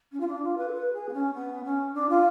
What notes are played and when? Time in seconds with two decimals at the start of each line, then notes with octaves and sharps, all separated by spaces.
0.12 C#4
0.20 F4
0.27 D4
0.42 F4
0.57 B4
0.67 A4
0.73 B4
0.93 G#4
1.08 B3
1.13 C#4
1.33 B3
1.64 C#4
1.94 D4
2.09 F4